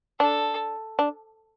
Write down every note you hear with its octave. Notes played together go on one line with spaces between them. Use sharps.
D4 A4
D4